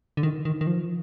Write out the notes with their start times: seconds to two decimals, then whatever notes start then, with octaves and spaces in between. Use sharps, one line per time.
0.17 D3
0.23 D#3
0.45 D#3
0.61 D#3
0.67 F3